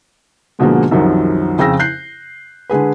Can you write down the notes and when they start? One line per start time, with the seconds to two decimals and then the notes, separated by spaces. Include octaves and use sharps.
0.59 G#2 B2 D3 F3 G#3 A#3
0.91 C2 F#2 D#3 F3
1.59 F2 C#3 G5 E6 A#6
1.79 F#6 G6 C7
2.70 D3 G#3 G#4 B4